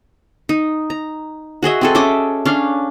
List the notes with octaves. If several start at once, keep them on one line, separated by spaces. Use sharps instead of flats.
D#4
A#5
F#4 G#4 D#5 E5
C4 G#4 A4
C#4 D#5 E5 D6
C#4 D4 F5